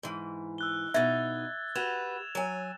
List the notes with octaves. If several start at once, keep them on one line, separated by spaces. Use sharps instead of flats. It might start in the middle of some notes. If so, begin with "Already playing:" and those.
G#2 E3
E6 F#6 G7
B2 D#4 E5 G#6 A6
F#4 G4 B4 G#6 E7 F7
F#3 G#5